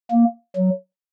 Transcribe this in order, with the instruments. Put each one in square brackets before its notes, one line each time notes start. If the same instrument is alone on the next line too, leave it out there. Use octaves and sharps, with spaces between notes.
[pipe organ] A#3
F#3